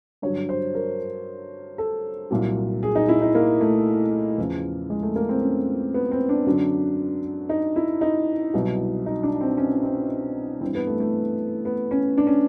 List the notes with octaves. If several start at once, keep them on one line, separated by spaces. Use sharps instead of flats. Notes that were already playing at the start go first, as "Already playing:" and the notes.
G2 D3 F#3 C#5
C5
A#4
A4
C2 A#2 F#3
G#4
D#4
E4
D#4
A#3
A3
E2 C#3 F3
G#3
A3
A#3
C4
C#4
B3
C4
D4
F#2 D3 F#3
D#4
E4
D#4
C2 B2 F#3
D#4
D4
C4
C#4
C4
G2 E3 C4
B3
A3
A3
B3
C#4
D4
C#4